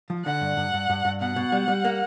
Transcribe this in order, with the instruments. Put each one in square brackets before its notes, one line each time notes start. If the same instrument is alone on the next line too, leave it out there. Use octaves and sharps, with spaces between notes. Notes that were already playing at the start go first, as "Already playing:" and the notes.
[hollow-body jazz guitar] F3
[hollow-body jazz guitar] D3 [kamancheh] F#5
[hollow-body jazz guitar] G2
G2
G2
G2
G2
[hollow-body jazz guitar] B2 [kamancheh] F#5
[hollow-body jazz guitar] B2
G3
G3
A#3